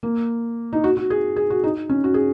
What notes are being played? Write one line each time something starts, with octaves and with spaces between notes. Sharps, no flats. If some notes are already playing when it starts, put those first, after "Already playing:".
A#3
D#4
F#4
F#4
G#4
G#4
F#4
D#4
C#4
F#4
G#4